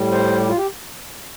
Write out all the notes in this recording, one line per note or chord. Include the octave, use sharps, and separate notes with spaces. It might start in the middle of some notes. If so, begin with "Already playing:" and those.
Already playing: A2 G3
C5
G4
F4
G4